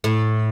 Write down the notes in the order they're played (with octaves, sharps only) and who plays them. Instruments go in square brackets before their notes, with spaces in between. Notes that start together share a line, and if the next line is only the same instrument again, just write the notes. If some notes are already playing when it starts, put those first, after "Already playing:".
[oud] A2